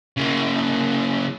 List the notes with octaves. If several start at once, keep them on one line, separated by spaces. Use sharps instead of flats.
C#3 A#3